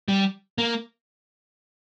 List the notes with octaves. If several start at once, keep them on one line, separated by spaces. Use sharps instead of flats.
G3
A#3